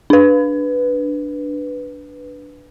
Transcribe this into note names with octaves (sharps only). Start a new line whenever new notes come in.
D4 B4